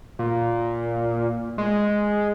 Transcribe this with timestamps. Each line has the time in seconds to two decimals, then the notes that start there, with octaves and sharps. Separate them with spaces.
0.19 A#2
1.58 G#3